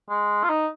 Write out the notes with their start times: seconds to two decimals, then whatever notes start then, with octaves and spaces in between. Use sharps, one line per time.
0.09 G#3
0.44 F4
0.49 D#4